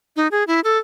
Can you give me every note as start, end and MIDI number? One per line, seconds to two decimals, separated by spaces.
0.16 0.28 63
0.32 0.44 68
0.47 0.60 64
0.64 0.78 69